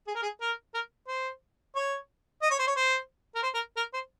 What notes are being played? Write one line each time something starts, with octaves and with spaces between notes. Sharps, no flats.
G#4
A#4
G#4
A#4
A#4
C5
C#5
D#5
C#5
C5
C#5
C5
A#4
C5
A#4
A#4
C5